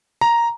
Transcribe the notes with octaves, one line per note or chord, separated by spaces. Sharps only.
A#5